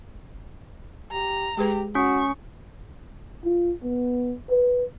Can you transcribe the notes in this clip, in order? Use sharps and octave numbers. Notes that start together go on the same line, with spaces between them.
G4 A#5
G#3 G4 G#4 B4
C#4 F#4 C#6
F4
B3
B4